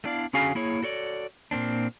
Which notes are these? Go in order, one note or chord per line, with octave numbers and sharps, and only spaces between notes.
A3 B3 D4 E4 D5 F5
D3 C#4 F#4 G#4 F5 G#5
A#3 E4 G#4 C#5
F#4 A4 C#5 D5
A#2 A#3 C4 D4